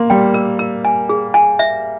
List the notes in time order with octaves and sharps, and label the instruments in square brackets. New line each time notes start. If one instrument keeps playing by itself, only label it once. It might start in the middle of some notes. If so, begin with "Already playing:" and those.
Already playing: [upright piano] A#3 [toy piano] C6
[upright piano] G3 [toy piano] G5
[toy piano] A#4
A#4
G#5
G#4
G#5
E5